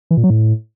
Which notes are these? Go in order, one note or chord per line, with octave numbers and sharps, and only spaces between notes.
E3
A#2
F#3
A2